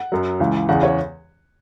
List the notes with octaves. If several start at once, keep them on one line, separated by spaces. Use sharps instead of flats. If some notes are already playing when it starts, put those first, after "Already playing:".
Already playing: F#5
F#2 F#3
C#2 C#3 E3
E2 C#3 E3 F#5
C#5